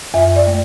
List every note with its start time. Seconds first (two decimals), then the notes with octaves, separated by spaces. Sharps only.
0.14 F#2 E5
0.36 D5
0.47 A3